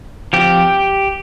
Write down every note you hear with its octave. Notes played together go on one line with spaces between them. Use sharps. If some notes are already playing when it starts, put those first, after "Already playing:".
F3 C4 G4